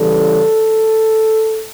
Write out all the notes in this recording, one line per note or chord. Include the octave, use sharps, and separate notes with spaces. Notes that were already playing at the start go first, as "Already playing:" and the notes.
Already playing: C#3 E3 G3 A4